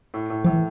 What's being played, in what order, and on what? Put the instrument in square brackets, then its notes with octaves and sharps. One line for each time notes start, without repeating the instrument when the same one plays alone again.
[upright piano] A2
A2
[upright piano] A2 [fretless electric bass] F3
[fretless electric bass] E3